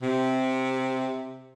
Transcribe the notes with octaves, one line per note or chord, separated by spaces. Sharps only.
C3